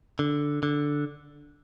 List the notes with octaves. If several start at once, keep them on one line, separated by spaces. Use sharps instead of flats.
D3
D3